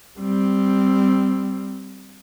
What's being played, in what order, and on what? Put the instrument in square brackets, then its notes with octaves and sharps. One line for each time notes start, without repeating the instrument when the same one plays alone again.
[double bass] G3 C4